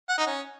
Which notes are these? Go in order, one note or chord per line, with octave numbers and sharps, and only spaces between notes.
F#5
D#4
C#4